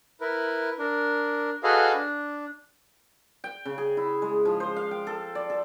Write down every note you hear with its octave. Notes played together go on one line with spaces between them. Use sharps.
E4 A#4 B4
D4 A#4
F#4 G#4 A4 B4 D#5 F5
D4
G5
C#3
G#4
E4
G#3
F3
C5
F5
G5
A4
D5
A4